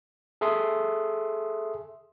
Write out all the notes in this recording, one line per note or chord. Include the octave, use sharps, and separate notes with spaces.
G#4 A4 E5 C6 D#6